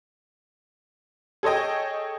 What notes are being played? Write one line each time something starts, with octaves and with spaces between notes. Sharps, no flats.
G#4 A4 C#5 D#5 G5